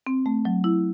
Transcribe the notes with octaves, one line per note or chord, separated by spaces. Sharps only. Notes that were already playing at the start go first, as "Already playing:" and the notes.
C4
A3
F#3
E4